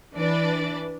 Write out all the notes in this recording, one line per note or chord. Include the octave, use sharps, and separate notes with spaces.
E3 D4 B4 D5